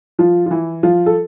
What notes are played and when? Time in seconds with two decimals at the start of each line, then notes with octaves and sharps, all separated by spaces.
0.19 F3 F4
0.46 F4
0.51 E3 E4
0.83 F3 F4
1.06 A4